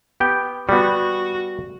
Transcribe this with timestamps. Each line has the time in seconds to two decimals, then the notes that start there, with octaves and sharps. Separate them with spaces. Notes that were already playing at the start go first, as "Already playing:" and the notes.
0.20 B3 G4 G5
0.69 G3 B3 F#4